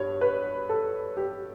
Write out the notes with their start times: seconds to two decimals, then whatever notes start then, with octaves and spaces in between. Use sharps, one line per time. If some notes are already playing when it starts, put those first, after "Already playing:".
Already playing: G2 C#5
0.21 B4
0.69 A4
1.17 G4